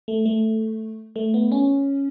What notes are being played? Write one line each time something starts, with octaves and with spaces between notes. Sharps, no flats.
A3
A3
A3
B3
C#4